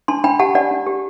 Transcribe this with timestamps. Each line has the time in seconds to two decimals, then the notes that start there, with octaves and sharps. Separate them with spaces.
0.08 D4 A5 C6
0.24 D4 G5 B5
0.39 G4 F#5 A5
0.55 D4 D5 F#5
0.71 D4
0.87 G4